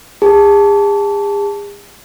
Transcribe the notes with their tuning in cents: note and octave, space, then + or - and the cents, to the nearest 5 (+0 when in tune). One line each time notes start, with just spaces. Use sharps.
G#4 -40 A5 +0